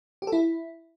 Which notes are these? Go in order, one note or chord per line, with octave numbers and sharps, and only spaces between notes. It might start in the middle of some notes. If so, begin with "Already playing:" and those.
G4
A4
E4